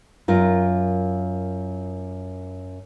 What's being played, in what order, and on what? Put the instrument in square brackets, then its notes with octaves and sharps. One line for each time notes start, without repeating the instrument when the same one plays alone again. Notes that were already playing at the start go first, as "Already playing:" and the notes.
[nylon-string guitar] F#2 F4 A#4